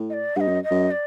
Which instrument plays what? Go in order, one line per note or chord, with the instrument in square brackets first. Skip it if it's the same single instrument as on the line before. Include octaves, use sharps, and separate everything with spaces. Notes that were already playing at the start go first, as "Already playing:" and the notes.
Already playing: [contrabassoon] A2
[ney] D#5
D5
[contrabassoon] G2 [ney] F#5
[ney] D#5
[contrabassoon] F#2
[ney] D#5
[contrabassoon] F#2
[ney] D5